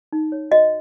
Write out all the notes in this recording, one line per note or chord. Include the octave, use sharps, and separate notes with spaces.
D#4
C#5
F#4 D#5